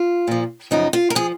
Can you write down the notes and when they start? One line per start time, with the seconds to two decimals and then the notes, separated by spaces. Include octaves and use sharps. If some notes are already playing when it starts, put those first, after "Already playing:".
Already playing: F4
0.27 A#2 F3
0.71 F#2 C#3 F3 D#4
0.93 F4
1.10 A#4
1.15 F3 G#4